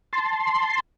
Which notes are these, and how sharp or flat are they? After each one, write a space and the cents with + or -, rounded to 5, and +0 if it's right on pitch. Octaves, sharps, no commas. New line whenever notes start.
A5 +0 C6 +0